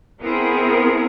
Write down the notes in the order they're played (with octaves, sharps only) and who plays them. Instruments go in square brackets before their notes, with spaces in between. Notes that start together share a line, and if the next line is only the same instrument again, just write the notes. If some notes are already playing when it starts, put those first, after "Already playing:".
[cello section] B3 C4 E4 G#4 A#4